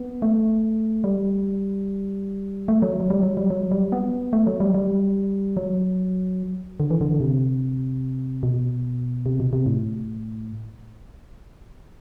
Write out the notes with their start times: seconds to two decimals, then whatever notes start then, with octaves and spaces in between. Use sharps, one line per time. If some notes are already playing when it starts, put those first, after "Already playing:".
Already playing: B3
0.22 A3
1.04 G3
2.68 A3
2.82 F#3
3.00 F#3
3.10 G3
3.23 F#3
3.37 G3
3.50 F#3
3.71 G3
3.92 B3
4.33 A3
4.47 F#3
4.60 G3
4.74 G3
5.57 F#3
6.80 D3
6.91 E3
7.01 D3
7.20 C3
8.43 B2
9.26 C3
9.40 B2
9.53 C3
9.66 A2